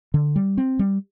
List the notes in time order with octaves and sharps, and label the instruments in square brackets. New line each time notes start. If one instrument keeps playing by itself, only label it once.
[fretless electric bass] D3
G3
C4
G3